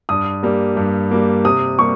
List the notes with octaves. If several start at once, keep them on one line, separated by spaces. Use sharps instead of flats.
G2 D#6
G3 A#3
G2
G3 A#3
C3 D#6
G3 A#3 C#6